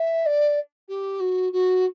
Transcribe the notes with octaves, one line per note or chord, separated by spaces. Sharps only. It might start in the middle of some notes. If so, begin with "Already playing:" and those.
Already playing: E5
D5
G4
F#4
F#4